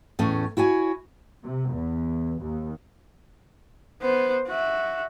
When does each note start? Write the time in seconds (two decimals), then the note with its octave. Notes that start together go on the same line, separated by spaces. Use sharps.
0.19 E2 A2 A3 C#4
0.57 E4 F#4 C#5 G#5
1.42 C3
1.72 E2
2.41 D#2
4.01 B3 C5
4.48 F#4 E5